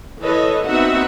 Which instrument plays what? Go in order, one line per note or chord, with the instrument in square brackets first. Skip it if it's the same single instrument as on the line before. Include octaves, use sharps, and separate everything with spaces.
[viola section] E3 A4 B4 C#5 D#5
B3 C4 D#4 F#4 E5 F#5